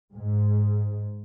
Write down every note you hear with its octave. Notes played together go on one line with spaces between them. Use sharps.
G#2